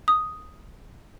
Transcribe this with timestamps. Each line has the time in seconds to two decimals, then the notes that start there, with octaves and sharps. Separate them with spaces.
0.08 D#6